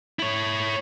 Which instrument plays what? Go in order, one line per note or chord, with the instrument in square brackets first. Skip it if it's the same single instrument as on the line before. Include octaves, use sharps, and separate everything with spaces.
[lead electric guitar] E4 C#5